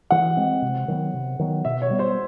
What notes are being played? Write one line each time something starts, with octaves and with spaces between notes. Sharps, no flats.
E3 F#5
G#3 C4
C3
D#3 F#3 B3
C3
D#3 F#3 B3
B2 E5
C#5
G3 B3
C5